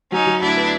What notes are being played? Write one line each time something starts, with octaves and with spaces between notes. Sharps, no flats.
F#3 C#4 D#4
F#3
D2 D4 E4
B3